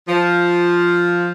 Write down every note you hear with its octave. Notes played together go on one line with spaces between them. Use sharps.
F3